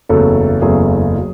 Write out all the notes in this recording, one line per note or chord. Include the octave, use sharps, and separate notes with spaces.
F#1 E2 C#3 F#3 A3 A4
F#1 E2 C#3 F#3 A3 G#4
F#3